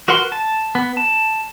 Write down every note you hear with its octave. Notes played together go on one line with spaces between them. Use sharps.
F#4 A#4 B4 F#5 C6
A5
B3
A5